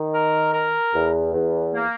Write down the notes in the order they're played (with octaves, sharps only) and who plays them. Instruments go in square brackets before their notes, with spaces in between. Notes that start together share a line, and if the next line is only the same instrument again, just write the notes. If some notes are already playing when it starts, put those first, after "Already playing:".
Already playing: [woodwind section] D#3
A#4
A#4
E2
E2
A#3